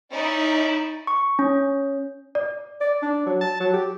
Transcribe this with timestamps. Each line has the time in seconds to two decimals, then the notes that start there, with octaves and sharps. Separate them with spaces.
0.12 C#4 D#4 E4 D5
1.07 C#6
1.39 C#4
2.35 D5
2.81 D5
3.02 D4
3.26 F#3
3.41 A5
3.60 F#3
3.73 G4